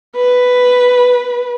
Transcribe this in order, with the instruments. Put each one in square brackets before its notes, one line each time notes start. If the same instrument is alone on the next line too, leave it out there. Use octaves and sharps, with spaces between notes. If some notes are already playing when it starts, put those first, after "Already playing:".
[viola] B4